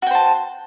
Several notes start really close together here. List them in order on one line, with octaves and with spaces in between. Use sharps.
F#4 G5 C5 A5